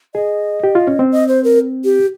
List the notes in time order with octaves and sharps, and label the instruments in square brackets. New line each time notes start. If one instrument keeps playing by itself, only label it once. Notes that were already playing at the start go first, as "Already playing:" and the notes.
[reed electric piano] G#4 [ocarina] D#5
[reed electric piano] G4
F4
C#4
C4
[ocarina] D#5
C5
A#4
G4